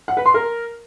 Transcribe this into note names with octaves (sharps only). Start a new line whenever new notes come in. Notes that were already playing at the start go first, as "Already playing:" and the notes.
F#5
B4
C6
A#4